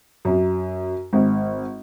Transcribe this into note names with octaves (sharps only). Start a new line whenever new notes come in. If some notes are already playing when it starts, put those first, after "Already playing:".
F#2
G#1